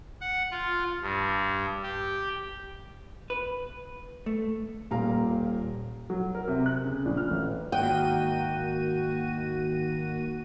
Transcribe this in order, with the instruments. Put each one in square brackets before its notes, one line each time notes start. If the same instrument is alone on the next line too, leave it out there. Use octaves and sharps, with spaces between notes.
[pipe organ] F#5
F4
G2
G4
[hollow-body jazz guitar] B4
A3
[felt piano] D#1 A#2 G4 F5 A#5
[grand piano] F#3
A#4
C3
F#6
C#3
A#1
F6
A1
[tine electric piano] G#2 F#5 F#6 [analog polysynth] D#3 A#3 D#7 [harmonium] F#4 [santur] G5